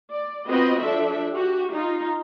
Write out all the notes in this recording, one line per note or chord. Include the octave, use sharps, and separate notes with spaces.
D5
B3 C4 F4 F#4 B4 D#5
F3 D4 A4 E5
F#4 G4
D#4 F4